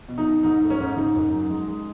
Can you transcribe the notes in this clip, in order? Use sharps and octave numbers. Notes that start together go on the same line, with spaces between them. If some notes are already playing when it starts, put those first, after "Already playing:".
B2
D#4
B2
G#2 D#4
A3
C#4
G#2
C#3 D#4
F#2
F#3
G#3
G#3